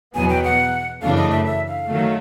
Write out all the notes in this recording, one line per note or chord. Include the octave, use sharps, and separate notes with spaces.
E2 B2 F#3 B3 G#5
G5
F#5
F#2 C#3 E3 A3 D4 F5
D#5
E5
E5
F5
D#3 F#3 A3